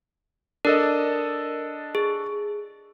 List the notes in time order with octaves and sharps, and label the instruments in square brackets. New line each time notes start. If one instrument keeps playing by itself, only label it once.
[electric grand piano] D4 A4 D#5 [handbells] A#4
[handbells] G#4